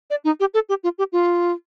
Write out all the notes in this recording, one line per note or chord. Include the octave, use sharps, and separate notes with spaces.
D5
D#4
G4
A4
G4
F4
G4
F4